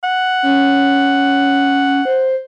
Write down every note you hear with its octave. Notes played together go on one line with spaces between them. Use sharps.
F#5
C#4
C5